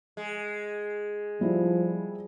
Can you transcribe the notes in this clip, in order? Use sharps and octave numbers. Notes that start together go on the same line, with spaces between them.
G#3
F3 G3 E4